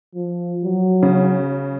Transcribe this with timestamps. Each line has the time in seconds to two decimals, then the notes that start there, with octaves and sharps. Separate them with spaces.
0.15 F3
0.64 F#3
1.03 C#3